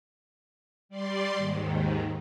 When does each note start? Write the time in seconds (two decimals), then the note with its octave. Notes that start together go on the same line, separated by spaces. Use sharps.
0.89 G3 D5 C6
1.36 D#2 G#2 D#3